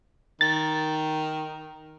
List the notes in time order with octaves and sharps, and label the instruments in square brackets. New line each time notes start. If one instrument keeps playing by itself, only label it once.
[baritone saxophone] D#3 [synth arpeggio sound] A6